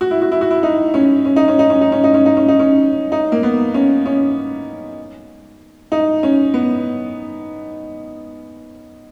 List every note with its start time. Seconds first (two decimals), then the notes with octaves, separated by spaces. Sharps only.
0.01 F#4
0.11 E4
0.22 F#4
0.32 E4
0.41 F#4
0.51 E4
0.63 D#4
0.94 C#4
1.25 C#4
1.36 D#4
1.48 C#4
1.59 D#4
1.70 C#4
1.81 D#4
1.92 C#4
2.04 D#4
2.14 C#4
2.26 D#4
2.37 C#4
2.48 D#4
2.59 C#4
3.12 D#4
3.32 A#3
3.43 B3
3.74 C#4
4.06 C#4
5.92 D#4
6.23 C#4
6.54 B3